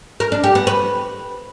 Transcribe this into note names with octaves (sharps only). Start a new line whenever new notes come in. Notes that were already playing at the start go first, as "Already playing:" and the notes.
A#4
D4
G4
B3
B4